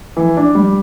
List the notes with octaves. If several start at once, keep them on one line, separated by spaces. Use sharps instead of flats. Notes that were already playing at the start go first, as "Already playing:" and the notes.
E3
D4
G3